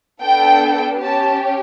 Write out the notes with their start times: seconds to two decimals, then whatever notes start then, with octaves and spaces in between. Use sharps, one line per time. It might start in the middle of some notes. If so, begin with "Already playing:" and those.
0.22 B3 D4 A4 G5
1.03 C#4 G4 A5